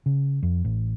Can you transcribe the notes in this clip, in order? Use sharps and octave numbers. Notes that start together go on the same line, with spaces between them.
C#3
F2
A1